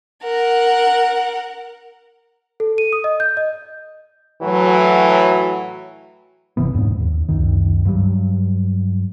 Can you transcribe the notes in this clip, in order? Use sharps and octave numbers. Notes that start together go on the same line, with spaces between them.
A#4 F#5
A4
D#7
D#6
D#5
G6
D#5
A2 E3 F#3
G1 C3 E3 B3
D1 F2 G#2 C#4
D#2
C#2 F#2 D#3
G2 F#3 G3